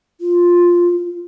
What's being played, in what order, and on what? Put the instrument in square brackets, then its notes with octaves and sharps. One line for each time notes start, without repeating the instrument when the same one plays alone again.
[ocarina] F4